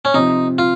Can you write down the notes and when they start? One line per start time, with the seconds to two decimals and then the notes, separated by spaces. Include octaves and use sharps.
0.05 C#4
0.14 C3 F3 C4 D#4
0.58 F4